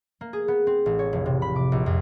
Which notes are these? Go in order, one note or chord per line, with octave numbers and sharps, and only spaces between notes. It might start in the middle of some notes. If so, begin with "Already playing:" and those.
A#3
G#4
B3
C4
A1
C#5
F1
C3
B5
D6
A#1
F2